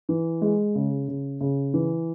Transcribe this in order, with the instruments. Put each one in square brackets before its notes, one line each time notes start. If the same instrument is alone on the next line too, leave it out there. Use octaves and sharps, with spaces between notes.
[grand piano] E3
G#3
C#3
C#3
C#3
E3